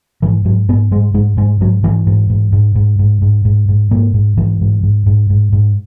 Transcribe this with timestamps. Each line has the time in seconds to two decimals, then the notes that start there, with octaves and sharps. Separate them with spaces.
0.22 G#2 E3
0.45 G#2 F#3
0.69 G#2 B3
0.91 G#2 G#3
1.14 G#2 G#3
1.37 G#2 G#3
1.61 G#2 F#3
1.83 G#2 E3
2.07 G#2
2.30 G#2
2.52 G#2
2.75 G#2
2.99 G#2
3.22 G#2
3.45 G#2
3.69 G#2
3.91 G#2 A#3
4.14 G#2
4.37 G#2 E3
4.61 G#2
4.83 G#2
5.06 G#2
5.30 G#2
5.52 G#2